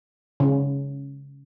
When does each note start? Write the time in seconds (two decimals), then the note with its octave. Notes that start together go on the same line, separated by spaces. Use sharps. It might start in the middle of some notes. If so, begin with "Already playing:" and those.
0.40 C#3